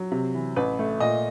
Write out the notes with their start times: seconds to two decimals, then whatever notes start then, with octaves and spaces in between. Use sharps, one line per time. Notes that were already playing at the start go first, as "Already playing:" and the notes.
Already playing: F#3
0.12 C3
0.34 E3
0.56 A1 B4
0.79 A3
1.00 A#2 D#5